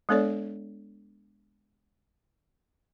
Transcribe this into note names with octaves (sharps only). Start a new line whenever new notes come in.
G#3 B3 D4 A4 C#5 D5